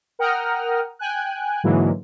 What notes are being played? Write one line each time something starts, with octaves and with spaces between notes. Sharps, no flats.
A#4 F#5 G5 A#5 D#6 F6
G5 G#5 F#6
G#2 D3 E3 F#3 G#3 A#3